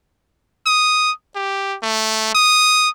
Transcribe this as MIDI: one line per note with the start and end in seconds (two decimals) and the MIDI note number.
0.66 1.11 87
1.36 1.77 67
1.83 2.32 57
2.35 2.89 87